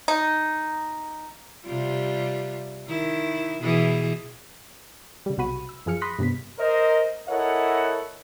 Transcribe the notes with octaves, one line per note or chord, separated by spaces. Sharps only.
D#4
C3 G3 F4
D#3 E4
B2 E3 G#4
C#3 G3
B1 C3 F#4 B5 D#7
E6
F#2 F3 G#4 F6 C#7
B5 C6 D#6 F#6 A#6 B6
G2 C3 B3 B6
A#4 C5 D#5
E4 A4 A#4 C#5 D#5 F#5